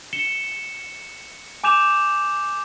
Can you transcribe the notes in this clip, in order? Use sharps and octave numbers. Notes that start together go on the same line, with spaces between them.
C#7 E7 G7
G#5 D6 G6 E7 F7